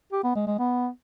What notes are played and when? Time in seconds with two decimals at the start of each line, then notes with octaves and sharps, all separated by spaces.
0.12 G4
0.24 B3
0.35 G#3
0.47 G#3
0.59 B3